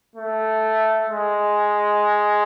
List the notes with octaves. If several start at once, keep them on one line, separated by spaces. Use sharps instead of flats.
A3
G#3